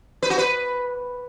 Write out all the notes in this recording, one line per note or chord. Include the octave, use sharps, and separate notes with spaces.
B4
F#4
B4